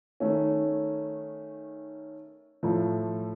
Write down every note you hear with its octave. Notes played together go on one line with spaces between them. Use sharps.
D#3 A3 C#4
A2 F3 A3